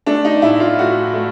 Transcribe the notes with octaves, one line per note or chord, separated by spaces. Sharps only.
A3 D4
D#4
A2 E4
F4
A2 F#4
A3